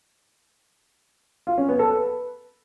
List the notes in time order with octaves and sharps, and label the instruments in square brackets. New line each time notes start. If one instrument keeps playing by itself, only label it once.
[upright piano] F4
C#4
B3
A4
B4